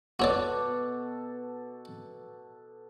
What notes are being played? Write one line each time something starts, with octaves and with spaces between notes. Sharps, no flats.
B2 F#4 A4 C#5 D5 D6